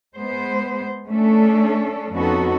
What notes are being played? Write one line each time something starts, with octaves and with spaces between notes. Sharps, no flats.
G#3 B3 C5
A3 C#4 D4 A4
F2 B3 C#4 D#4 F#4 A4